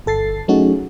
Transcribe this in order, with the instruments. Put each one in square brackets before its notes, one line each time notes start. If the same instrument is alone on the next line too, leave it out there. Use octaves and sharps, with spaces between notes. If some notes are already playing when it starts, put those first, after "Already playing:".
[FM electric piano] G1 A4 A6 C7
F#3 A3 C#4 D#4 F#4 G#4